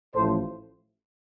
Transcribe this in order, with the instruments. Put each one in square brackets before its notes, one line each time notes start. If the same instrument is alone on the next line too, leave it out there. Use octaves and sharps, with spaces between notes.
[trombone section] A1 A2 F3 A4 C5